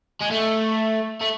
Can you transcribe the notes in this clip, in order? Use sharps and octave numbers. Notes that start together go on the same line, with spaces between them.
G#3
A3
A3